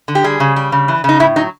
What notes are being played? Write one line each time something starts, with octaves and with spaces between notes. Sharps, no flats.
D3
G4
G3 G#4
C#3
G3
C#3
E3
C#3 D#4
A2 E4
F#3 D#4